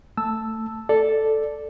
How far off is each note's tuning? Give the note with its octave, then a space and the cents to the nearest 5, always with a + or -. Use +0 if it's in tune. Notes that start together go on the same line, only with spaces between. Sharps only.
A3 +20 A5 +0 E6 +0
A4 +0 D5 +0